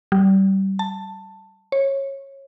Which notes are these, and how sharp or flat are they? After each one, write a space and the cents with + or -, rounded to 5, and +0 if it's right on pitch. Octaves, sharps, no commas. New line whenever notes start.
G3 -25
A5 +10
C#5 -20